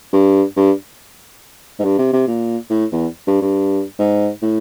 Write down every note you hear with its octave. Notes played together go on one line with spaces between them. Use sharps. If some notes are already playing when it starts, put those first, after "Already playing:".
G2
G2
G#2
G2
C3
C3
A#2
A2
E2
G2
G2
G#2
A2